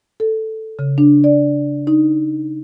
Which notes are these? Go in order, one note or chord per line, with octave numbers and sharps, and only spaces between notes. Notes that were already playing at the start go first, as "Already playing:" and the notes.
A4
C#3
D4
D5
D#4